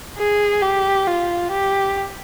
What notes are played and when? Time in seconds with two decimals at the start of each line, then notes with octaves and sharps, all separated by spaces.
0.18 G#4
0.62 G4
1.07 F4
1.51 G4